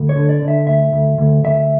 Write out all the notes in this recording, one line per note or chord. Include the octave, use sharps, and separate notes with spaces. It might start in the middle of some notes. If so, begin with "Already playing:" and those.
Already playing: D2
C#5
D3
D5
D3
E5
D2 E5
D2
D2
D2 E5